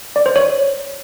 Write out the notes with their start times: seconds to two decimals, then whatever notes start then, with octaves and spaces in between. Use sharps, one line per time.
0.16 D5
0.26 C5
0.36 C#5